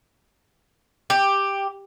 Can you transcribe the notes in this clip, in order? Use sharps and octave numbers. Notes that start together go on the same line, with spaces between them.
G4